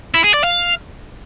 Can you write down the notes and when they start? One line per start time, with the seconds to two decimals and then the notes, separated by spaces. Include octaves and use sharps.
0.14 E4
0.24 G#4
0.34 D5
0.44 F5